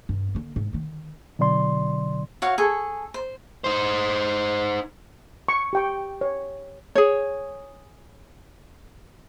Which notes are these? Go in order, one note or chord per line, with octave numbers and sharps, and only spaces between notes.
G2
D3 A#3
G#2
D3 D#3
B2 D3 F#3 D5 C6
F#4 C#5 F5
G#4 A4 C#6
C5
D#4 C5
C#6
G4 G5 C#6
C#5
G#4 C#5